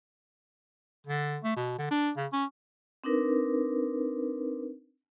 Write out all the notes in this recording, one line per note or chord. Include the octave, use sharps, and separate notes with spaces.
D3
A3
B2
D3
D4
C#3
C#4
C4 D4 D#4 A#4 B4